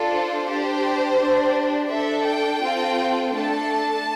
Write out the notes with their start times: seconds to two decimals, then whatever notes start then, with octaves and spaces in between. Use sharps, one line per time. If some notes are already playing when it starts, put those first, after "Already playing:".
Already playing: D4 F4 A4
0.10 C5
0.45 D4 G4
1.17 D4 G4
1.91 D4 A4 E5
2.26 G5
2.63 C4 F4 A4
3.34 A3 D4 A4 A5